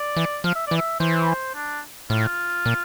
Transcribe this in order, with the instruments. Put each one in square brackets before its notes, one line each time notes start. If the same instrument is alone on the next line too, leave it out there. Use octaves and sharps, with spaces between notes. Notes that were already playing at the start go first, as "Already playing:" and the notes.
Already playing: [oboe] D5
[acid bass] E3
[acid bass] F3 [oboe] F5
[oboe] E5
[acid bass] E3 [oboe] D5
[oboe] E5
[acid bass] E3 [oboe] C5
[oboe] D4
[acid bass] A2 [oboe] F4
[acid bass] A#2